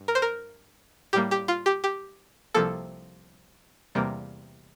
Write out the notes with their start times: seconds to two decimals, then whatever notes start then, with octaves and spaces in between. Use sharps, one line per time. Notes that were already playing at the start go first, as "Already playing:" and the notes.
Already playing: G2
0.08 A#4
0.15 C5
0.22 A#4
1.13 A2 G3 A#3 G4
1.31 G4
1.48 F4
1.66 G4
1.84 G4
2.54 C2 C3 F3 A#3 A4
3.95 E2 C3 G3 A#3